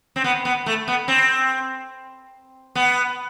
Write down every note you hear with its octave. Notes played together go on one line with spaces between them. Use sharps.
C4
B3
B3
A3
B3
C4
B3